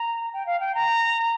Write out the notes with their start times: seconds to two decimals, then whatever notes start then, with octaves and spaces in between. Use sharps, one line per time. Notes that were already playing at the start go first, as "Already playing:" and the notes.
Already playing: A#5
0.33 G5
0.46 F5
0.60 G5
0.75 A#5